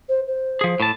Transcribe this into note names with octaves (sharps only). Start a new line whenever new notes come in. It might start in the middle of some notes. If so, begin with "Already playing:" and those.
C5
C5
F3 G#4
A2 A5